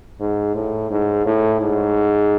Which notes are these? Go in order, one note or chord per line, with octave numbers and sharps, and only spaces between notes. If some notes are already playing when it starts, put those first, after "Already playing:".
G#2
A2
G#2
A2
G#2